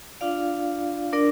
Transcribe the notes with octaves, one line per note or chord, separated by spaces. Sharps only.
D4 F4 D5 F5
D4 A#4 D5